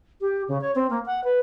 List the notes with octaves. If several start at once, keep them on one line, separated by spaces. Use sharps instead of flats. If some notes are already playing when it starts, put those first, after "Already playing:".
G4
C#3
C#5
C4
A#3
F#5
B4